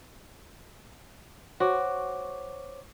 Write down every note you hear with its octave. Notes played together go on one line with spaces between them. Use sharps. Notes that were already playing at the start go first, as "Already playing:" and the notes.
F#4 C5 C#5 D6